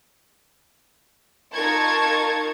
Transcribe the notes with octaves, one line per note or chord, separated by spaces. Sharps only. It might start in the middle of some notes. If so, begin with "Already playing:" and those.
D#4 F4 A#4 A5 C#6 G#6